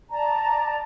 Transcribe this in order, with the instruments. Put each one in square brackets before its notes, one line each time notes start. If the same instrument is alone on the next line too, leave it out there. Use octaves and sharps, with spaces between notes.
[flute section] D5 A5 A#5